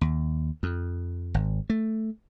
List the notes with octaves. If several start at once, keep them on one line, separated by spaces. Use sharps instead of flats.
D#2
F2
G#1
A3